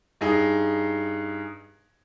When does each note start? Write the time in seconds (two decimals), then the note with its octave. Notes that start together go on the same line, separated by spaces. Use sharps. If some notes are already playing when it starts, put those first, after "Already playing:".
0.21 G2 D#4 G#4